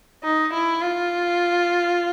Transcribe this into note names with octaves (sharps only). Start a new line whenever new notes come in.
D#4
E4
F4